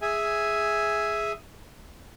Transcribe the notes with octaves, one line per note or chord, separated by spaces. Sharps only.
G#4 E5 G#5